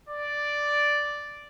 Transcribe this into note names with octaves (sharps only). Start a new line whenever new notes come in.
D5